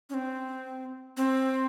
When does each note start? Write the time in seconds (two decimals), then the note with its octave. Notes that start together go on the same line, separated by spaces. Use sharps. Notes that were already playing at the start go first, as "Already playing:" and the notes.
0.10 C#4
0.14 C4
1.17 C4